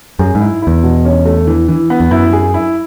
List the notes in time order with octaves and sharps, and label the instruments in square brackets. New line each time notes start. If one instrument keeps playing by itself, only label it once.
[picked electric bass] F#2 [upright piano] G#4
[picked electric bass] G#2
[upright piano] E4
[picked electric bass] E2 [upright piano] E4
[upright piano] B2
C#4
A3
E3
E3
B3
[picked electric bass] E2
[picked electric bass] F#2 [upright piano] E4
[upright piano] G#4
E4